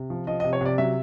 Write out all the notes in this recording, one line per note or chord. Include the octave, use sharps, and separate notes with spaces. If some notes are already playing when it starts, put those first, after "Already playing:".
Already playing: C3
F3
F3 D#5
D#5
C3
C#5
C3 D5
F#3 E5